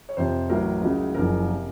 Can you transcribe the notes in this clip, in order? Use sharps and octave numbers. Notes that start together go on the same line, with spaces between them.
C#5
F2 C3 F3 C5
A1 A2 F#3 A#4
C#2 C#3 F#3
F#1 F#2 F3 A#4
C3